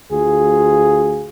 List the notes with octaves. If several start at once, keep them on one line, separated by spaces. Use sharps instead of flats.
D2 F4 G#4